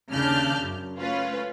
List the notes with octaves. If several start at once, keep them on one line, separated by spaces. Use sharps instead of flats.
D#2 C#3 D4 A5 F6 G6
F#2
A3 C#4 F4 B4